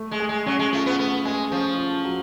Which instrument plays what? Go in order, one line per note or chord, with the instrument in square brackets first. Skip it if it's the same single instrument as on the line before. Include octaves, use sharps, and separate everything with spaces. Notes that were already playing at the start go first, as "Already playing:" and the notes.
Already playing: [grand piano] A3
[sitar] G#3
[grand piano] G#4
[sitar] G#3
[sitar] F#3 [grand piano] C#4
[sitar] G#3
[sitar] A3 [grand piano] F4
[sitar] B3
[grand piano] A3 [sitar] B3
[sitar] G#3 [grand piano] G#4
[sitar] F3 [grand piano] C#4
[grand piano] F4
F#3